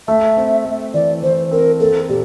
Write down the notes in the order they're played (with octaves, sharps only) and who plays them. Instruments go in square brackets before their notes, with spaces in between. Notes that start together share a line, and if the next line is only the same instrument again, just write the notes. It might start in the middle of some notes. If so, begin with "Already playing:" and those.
[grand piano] A3 [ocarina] E5
[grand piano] C4
A3
[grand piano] E3 [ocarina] D5
[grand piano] E3 [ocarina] C5
[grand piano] C4 [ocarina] A#4
[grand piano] A#3 [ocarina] A4
[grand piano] A#2 [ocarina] G4